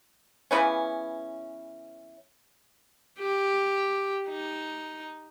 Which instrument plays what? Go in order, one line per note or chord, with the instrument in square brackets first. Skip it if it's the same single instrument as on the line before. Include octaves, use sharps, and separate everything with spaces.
[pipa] C#3 E3 B3 C#4
[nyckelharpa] G4
D#4